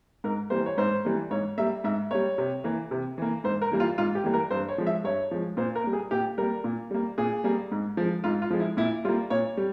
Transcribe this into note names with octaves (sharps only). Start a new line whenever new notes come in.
G#2 A#4
E3 G3 A#3 C5
C#5
G#2 C5
E3 G3 A#3
G#2 C#5
G3 A#3 E5
G#2 E5
G3 A#3 C#5
C3
E3 A#3
C3
E3 A#3
G#2 C5
A#4
E3 G3 A#3
F4
G#2 F4
G4
E3 G3 A#3
A#4
G2 C5
C#5
F3 G#3
E5
G2 C#5
F3 G#3
A#2 C5
A#4
G3 A#3
G#4
A#2 G4
G3 A#3 A#4
A#2
G3 A#3
A#2 G#4
G3 A#3
G#2
F3 G#3
G#2 F4
F4
F3 G#3
E4
A#2 E4
G3 A#3 F4
A#2 C#5
G3